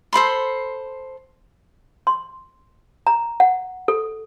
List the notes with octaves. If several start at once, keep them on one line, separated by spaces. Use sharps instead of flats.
A4 C5 B5 C6
C6
A#5
F#5
A4